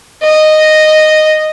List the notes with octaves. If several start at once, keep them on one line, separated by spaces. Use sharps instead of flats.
D#5